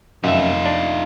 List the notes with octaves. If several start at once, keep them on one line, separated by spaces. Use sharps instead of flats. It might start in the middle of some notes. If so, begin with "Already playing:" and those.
F1 F#2 D#4 F4 E5
D4